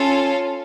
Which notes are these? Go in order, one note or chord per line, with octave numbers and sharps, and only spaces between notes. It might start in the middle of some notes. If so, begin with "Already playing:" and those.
Already playing: C#4 F4 A4